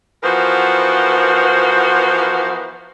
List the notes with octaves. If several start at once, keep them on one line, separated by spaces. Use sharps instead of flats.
E3 F3 B3 F#4 A#4 C5